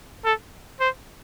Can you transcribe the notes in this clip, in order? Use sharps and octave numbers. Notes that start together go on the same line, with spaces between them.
A4
C5